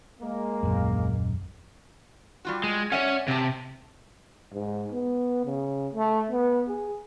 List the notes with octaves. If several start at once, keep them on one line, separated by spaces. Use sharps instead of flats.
G#3 A#3
D#1 A#1 F#2
G3 F4 F#4
G#3
C#4 C#5 D5 E5 F#5
C3 E5 A5
G#2
B3
C#3
A3
B3
G#4